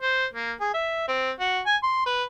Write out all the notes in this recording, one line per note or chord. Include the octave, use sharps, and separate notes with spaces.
C5
A#3
G#4
E5
C4
F#4
G#5
C6
B4